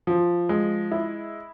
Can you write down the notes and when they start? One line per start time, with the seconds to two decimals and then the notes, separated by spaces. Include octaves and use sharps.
0.07 F3
0.49 G#3
0.92 E4